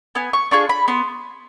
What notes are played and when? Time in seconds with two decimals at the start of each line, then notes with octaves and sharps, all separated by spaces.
0.15 B3 G#5
0.33 C#6
0.51 D4 F4 G#4 C#6
0.69 B5
0.88 B3 C6